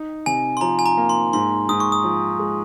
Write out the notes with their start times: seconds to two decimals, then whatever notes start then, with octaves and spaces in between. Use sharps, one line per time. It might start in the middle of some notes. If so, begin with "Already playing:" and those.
Already playing: D#4
0.26 C3 G#5
0.57 C6
0.61 F3 A#5
0.79 G#5
0.86 A#5
0.97 A#3
1.09 C6
1.33 G#2 C6
1.69 G#2 D#6
1.80 C#6
1.92 D#6
2.04 F3
2.39 G#3